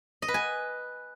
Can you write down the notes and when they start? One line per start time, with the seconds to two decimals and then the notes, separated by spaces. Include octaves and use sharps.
0.22 D#5
0.28 B4
0.34 G#5